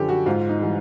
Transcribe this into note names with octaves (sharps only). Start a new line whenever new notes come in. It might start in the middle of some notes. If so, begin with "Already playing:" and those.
Already playing: F#2 D3 F3 G4 A4
F#4
G#2 F4
D#4
E3 G3